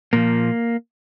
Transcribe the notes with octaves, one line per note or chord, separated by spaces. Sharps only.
A#2 F3 A#3